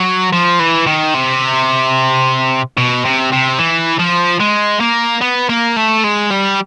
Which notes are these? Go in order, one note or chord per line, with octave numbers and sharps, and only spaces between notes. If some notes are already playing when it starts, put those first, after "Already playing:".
Already playing: F#3
F3
E3
D#3
C3
B2
C3
C3
E3
F3
G#3
A#3
B3
A#3
A3
G#3
G3